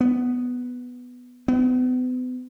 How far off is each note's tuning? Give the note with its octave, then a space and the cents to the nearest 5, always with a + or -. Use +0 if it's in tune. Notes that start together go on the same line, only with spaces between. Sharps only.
B3 +5
B3 +40